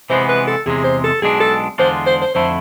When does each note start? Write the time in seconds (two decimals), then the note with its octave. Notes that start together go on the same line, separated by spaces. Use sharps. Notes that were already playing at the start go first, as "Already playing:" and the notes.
0.10 C3 E3 G#3 B3 C5
0.29 B4
0.47 A4
0.66 E2 C3 G#3 G#4
0.84 C5
1.04 A4
1.22 B1 B2 G#3 D4 G#4
1.40 A4
1.78 E2 D3 G#3 D4 F4 C5
2.06 C5
2.22 C5
2.35 F2 D3 A3 E4 C5